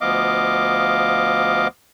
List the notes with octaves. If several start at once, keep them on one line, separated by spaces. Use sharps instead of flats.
D2 F3 B3 D#5 F5 D6